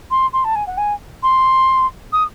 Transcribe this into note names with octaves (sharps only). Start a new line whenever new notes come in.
C6
C6
A5
G#5
F#5
G#5
C6
D#6